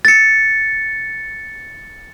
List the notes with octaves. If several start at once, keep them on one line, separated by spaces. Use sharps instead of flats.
A6 C#7